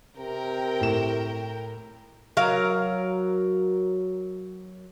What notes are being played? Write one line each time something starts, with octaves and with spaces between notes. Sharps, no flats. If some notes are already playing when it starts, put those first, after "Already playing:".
C3 A#4 G5
A2 E7
F#3 A#4 F5